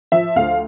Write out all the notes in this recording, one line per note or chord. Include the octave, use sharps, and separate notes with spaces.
F3 E5
D2 F5